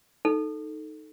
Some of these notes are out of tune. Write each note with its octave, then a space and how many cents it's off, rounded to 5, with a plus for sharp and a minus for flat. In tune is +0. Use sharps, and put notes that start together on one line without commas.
D#4 +0 A4 +0